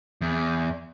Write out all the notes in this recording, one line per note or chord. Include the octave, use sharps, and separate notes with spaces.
E2